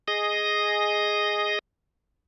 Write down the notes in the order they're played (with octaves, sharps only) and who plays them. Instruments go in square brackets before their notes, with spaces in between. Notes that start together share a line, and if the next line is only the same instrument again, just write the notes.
[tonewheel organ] G#4 D#5 D#6 A#6